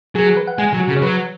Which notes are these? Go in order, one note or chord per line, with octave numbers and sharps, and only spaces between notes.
F#3 G#4
G#4
B4
F#5
G#3 G#5
G#5
F#3
F#4
C#3
G#4
C#5
F#3 B4